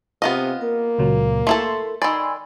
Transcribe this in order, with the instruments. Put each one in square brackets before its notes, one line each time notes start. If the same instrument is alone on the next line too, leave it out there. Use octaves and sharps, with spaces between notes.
[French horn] C3 [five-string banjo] B3 F4 D#5 [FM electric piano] F5
[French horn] A#3 [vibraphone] A#4
[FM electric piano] C#2 A#2 F#3
[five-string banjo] A3 E4 A4 [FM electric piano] C6
[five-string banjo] D#3 D5 [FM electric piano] G#5 C6 D6 [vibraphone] B5 E6